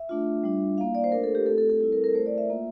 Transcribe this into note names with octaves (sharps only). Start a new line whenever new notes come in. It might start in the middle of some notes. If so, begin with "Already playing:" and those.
Already playing: E5
A3 D4 F4
G3 D4 F4
A#3 E4 F5
D5
C5
A3 D4 F4 A#4
A4
G4
A3 C4 F4 A4
A4
A4
G3 C4 E4 A4
A#4
A#4
A3 E4 C5
D5
E5
A#3 F4